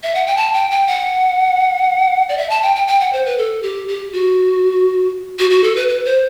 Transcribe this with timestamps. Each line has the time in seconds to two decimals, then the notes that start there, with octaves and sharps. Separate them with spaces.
0.03 E5
0.15 F#5
0.27 G5
0.37 A5
0.54 G5
0.71 G5
0.87 F#5
2.29 D5
2.38 E5
2.50 A5
2.63 G5
2.76 G5
2.88 G5
3.00 F#5
3.13 C5
3.26 B4
3.38 A4
3.63 G4
3.88 G4
4.13 F#4
5.39 F#4
5.50 F#4
5.64 A4
5.76 B4
5.88 B4
6.05 C5